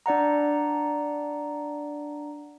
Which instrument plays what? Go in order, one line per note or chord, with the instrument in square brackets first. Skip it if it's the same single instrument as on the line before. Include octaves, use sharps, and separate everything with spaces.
[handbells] D4 D5 F#5 A#5